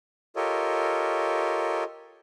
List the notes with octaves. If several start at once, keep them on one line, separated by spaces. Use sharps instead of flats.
F4 G4 A4 A#4 C#5 D#5